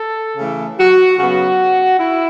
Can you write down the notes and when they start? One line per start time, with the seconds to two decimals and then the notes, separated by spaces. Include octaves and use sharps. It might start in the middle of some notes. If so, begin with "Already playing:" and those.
Already playing: A4
0.37 C#3 E3 A3
0.78 F#4
1.18 C#3 F#3 B3 F#4
2.00 E4